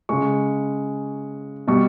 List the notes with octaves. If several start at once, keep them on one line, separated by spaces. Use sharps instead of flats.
C#3 G#3 C#6
B2 G3 C#6